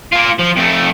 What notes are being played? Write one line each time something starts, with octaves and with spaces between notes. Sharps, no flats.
A#3 F4
F3
F2 A3